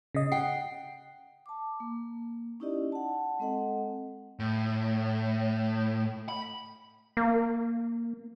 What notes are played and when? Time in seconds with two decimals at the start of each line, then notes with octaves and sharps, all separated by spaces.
0.15 C#3 D#5
0.32 F#5 G5 C7
1.46 A5 D6
1.80 A#3
2.60 C#4 D#4 E4 G4 D5 D#5
2.92 F#5 A5
3.39 G#3 C4 A4 D#5 F#5
4.39 A2
6.29 B5
7.17 A#3